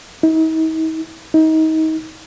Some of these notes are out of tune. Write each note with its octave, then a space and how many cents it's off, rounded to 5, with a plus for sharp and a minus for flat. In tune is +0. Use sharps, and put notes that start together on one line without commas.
D#4 +45
D#4 +30